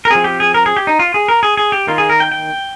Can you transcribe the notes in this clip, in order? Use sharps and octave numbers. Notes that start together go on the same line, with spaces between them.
A#4
F3 C4 G#4
G4
G#4
A#4
G#4
G4
D#4
F4
G#4
A#4
G#4
G#4
G4
D#3 A#3 F4
G#4
A#4
G5
G5